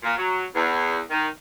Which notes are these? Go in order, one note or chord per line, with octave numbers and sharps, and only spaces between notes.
A#2
F#3
E2
D#3